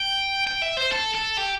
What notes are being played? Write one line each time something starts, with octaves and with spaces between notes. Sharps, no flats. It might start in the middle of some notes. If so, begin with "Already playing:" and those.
Already playing: G5
G5
E5
C5
A4
A4
G4